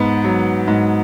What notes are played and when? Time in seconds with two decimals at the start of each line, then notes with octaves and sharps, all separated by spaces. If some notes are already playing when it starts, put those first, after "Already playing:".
Already playing: G#2 B3
0.24 F#3
0.67 G#2